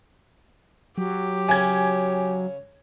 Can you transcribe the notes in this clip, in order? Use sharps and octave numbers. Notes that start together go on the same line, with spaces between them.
F#3 G4
C#3 C#4 G#5 G#6